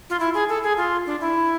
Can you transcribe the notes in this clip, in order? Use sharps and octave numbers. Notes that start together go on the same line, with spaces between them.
F4
E4
G#4
A4
G#4
F4
D4
E4